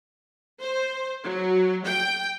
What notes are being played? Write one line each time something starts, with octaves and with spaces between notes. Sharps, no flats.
C5
F#3
G5